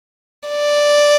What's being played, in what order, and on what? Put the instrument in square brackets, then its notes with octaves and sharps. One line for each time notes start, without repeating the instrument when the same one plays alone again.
[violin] D5